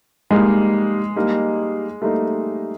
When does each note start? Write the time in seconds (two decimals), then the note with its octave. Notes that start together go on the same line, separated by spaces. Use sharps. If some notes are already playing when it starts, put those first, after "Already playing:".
0.31 G3 G#3 A#3 D#4
1.16 G3 A#3 D#4
2.02 G3 A3 A#3 D#4